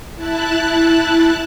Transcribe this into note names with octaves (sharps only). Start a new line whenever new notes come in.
E4 A5 F#6